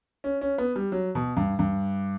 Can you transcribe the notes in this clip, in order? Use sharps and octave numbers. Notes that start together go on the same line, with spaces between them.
C#4
C#4
B3
G3
F#3
B2
G2
G2